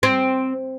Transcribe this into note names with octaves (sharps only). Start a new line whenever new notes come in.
C4